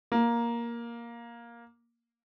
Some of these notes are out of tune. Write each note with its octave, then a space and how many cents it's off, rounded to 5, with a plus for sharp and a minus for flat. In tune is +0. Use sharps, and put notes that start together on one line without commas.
A#3 +10